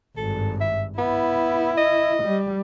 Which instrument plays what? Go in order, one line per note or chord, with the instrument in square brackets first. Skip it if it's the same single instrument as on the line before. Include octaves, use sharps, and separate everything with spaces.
[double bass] G#1 G2 [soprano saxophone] A4
[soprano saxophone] E5
[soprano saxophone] B3 [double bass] E4
[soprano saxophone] D#5
[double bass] G3